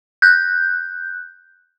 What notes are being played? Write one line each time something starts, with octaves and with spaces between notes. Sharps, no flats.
F#6 G6